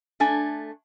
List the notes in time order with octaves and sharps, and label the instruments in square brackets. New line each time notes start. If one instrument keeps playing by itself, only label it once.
[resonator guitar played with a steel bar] A3 D4 G#5